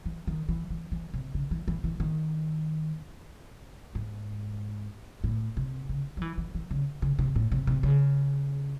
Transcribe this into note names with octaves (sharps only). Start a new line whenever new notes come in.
E3
D#3
E3
E3
E3
C3
C#3
E3
E3
E3
D#3
G#2
A2
C3
C#3
F#3
E3
E3
E3
C#3
C#3
C3
A2
C3
C3
C#3